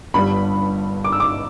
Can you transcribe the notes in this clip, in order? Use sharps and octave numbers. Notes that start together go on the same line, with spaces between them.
G1 G2 G3 B5
D6
E6
D6